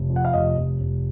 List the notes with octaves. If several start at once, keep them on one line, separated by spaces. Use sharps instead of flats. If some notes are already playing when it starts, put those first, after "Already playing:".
Already playing: F1
F2
F#5
F5
F1 D#5
F1
F1